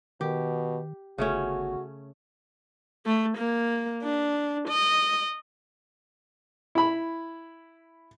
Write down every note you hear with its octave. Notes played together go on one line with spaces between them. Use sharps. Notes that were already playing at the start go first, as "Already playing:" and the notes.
B2 D#3 G4
G1 C#3 A3 C#4 F#4
A3
A#3
D4
D#5
E4 B5